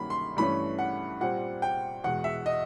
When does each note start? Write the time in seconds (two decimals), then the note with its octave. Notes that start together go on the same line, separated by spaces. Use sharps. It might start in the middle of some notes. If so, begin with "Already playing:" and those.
Already playing: G2 D#3 F#3 A#3 C#4 B5
0.10 C6
0.37 G2 E3 A3 C#4 B5
0.79 F#5
1.21 A#2 G3 C4 F#5
1.62 G5
2.04 E2 B2 G#3 F#5
2.24 E5
2.46 D#5